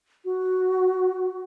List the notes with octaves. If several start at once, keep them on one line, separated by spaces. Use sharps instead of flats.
F#4